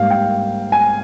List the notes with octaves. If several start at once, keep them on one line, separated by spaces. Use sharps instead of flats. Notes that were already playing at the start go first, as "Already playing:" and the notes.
Already playing: G#2 G3 A#3 F5
G5
G#5